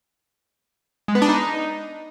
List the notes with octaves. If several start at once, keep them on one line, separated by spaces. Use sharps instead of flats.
G#3
B3
D4
D#4